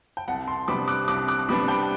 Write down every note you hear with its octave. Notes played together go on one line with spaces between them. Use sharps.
G5
C2 F#5 A5
A5 C6
C3 G3 B3 D4 B5 D6
D6 F#6
C2 D6 F#6
D6 F#6
C3 G3 B3 D4 B5 D6
G5 B5